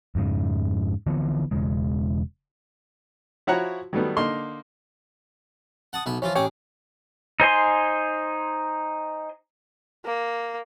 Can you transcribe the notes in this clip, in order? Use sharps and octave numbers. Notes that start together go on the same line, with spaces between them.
F2 G#2 C#3
D3 E3 F3 B3
E1 C#3 G#3
F3 E4 F#4 C#5 F#5 A#5
D#3 F#3 G3 A3 B3
D3 A#3 D#4 C6
F#5 A5 D#6
B1 B3 E5
E3 F3 F4 C#5
A1 G#4 C#5 G5 D6
D#4 C5 G#5 C6
A#3